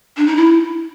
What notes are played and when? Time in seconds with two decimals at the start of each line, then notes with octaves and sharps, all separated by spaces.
0.17 D4
0.27 D#4
0.37 E4